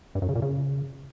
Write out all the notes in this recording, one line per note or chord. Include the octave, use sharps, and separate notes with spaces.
G2
F#2
C#3
A#2
C#3